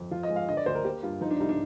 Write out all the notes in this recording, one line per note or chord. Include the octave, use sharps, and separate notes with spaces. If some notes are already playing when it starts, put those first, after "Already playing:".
Already playing: F2
F3 F4
D#5
G#3
F5
D3 D#5
D5
D2 C5
A#4
A#3 G4
G2 F4
F3 D#4
D4
C2 D#4
D4